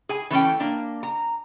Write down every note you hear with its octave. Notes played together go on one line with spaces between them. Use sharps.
G#4 G#5
E3 A3 C#4 G5
A#3 D4
A#5